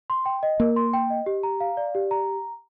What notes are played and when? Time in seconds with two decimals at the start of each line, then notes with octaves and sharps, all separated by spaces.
0.10 C6
0.26 G5
0.43 D#5
0.60 A#3 A#4
0.76 C6
0.93 G5
1.10 D#5
1.26 G4
1.43 A#5
1.60 F5
1.77 D5
1.95 G4
2.11 A#5